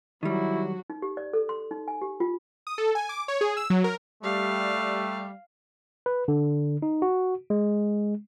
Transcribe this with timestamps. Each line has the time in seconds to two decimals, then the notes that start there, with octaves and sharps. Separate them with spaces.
0.23 D#3 F#3 G3 E4 F#4
0.90 D#4
1.02 G4
1.17 D5
1.33 A4
1.49 C6
1.71 D#4
1.88 G#5
2.02 G4
2.20 F4
2.67 D#6
2.78 A4
2.95 G#5
3.09 D6
3.28 C#5
3.41 G#4
3.57 E6
3.70 F#3
3.84 A#4
4.23 G3 A3 F5
6.06 B4
6.28 D3
6.82 D#4
7.02 F#4
7.50 G#3